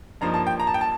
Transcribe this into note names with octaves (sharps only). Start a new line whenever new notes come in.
G2 F3 A#3 D#4 A#5
A5
G5
A#5
A5
G5
A5